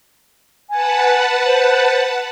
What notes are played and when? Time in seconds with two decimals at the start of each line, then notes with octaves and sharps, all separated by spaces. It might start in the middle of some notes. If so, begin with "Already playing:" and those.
0.70 B4 F#5 G#5 A5
1.46 C5